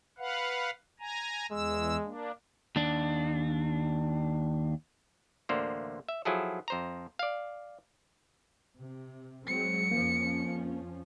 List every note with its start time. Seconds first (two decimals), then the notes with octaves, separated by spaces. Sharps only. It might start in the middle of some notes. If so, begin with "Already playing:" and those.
0.18 B4 F5 F#5
1.00 G#5 A#5
1.51 E2 G#3 E6
2.04 A#3 D4
2.76 D#2 D4
5.49 A1 D2 D3 A#3 C5
6.09 E5
6.25 F3 F#3 E4 G#4 A4
6.68 F2 C5 A#5
7.19 D5 F5
8.77 C3
9.47 F#3 G#3 C4 C#7
9.91 F2 F3 A#3 C#4